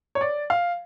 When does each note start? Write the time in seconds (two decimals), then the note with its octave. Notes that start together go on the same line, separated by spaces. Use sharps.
0.15 C#5
0.21 D5
0.50 F5